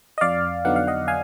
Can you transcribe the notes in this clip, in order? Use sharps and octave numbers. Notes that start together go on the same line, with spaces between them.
D#5
F2 D5 F5
D3 F#3 B3 D#4 F#5
F5
D#5 F#5
F5 G#5